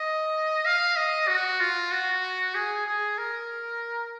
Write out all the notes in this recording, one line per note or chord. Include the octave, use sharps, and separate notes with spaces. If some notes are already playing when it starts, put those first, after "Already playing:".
Already playing: D#5
F5
D#5
F#4
F4
F#4
G#4
G#4
A#4